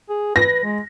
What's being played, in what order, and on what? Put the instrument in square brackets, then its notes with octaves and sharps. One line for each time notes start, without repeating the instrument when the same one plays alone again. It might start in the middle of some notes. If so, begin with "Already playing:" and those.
[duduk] G#4
[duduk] B4 [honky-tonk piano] A#6
[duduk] G#3